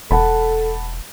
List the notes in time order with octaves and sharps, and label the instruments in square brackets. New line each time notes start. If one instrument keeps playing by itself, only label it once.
[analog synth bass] E1 [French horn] A4 [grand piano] F#5 A5 B5